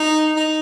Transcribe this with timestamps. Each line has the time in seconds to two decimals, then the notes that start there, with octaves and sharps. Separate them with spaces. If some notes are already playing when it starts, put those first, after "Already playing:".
Already playing: D#4
0.36 D#4